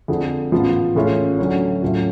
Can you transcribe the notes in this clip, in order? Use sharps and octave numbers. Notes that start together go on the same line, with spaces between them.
F2 D3 F3 G#3
A1 G#2 F3 B3 F4
A1 A2 G#3 C#4 F4
D2 D3 F#3 A3 C#4
A2 F#3 A3 C#4 F4